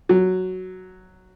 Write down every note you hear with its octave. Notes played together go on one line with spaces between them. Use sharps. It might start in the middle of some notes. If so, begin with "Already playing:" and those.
F#3